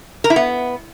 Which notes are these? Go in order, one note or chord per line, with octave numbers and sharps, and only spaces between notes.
A#4
E4
B3